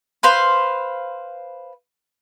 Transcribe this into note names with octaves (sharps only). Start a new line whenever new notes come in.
B4 C5 F5